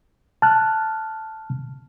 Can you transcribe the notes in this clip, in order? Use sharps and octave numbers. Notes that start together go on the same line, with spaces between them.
A5 F6 F#6